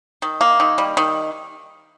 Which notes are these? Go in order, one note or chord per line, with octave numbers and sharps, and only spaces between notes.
D#3
A#3
D#3
G3
D#3